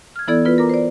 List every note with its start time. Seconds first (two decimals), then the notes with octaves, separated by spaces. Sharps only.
0.16 F6 G#6
0.28 E3 B3 E4 A4 D5 G#6
0.45 B3 F4 B4
0.58 A#4 A#5 D6
0.69 C5 D5